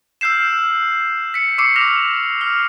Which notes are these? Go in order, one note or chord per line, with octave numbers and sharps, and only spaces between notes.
E6 F6 G6 C7 E7
B6 C#7
C#6 D6 E6 C7 C#7
F6 A#6 B6 E7 F7
F6 C7